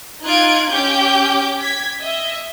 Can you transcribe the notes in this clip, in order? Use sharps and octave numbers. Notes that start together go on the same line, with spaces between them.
D#4 F4 F#6 G#6 D7
C#4 G4 G5 D6 G6
G#6 B6
D#5 E5